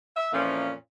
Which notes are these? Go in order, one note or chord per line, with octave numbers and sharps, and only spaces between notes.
E5
F2 A#2 E3 F3 A#3 C#4